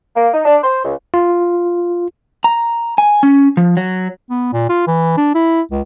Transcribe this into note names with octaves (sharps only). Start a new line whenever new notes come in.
A#3
D#4
D4
C5
C#2
F4
A#5
G#5
C#4
F3
F#3
B3
A#2
F4
E3
D4
E4
C#2